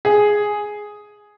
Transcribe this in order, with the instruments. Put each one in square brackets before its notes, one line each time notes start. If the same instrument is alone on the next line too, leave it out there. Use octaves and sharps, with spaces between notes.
[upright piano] G#4